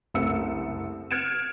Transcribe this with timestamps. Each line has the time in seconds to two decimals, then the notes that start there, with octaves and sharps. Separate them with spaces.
0.14 F#1 C2 A3 C4 E6 C#7
1.11 F6 F#6 G#6 C#7 D7 E7